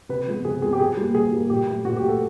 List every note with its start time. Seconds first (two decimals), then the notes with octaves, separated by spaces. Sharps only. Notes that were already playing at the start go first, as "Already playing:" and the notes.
0.09 C3 B4
0.27 F3 G#3 B3
0.45 C3 G#4
0.62 F3 G#3 B3 G#4
0.73 G4
0.79 B2 G#4
0.97 G3 A#3
1.15 B2 G#4
1.32 G3 A#3
1.50 A#2 G4
1.68 F#3 A3
1.85 A#2 F#4
1.96 G4
2.02 F#3 A3
2.08 A4